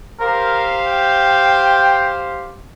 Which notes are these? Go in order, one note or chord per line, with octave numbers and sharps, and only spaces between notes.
G4 A#4 C5 F5
G5